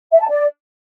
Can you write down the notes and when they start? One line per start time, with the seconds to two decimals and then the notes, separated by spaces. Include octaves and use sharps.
0.12 E5
0.21 A5
0.29 D5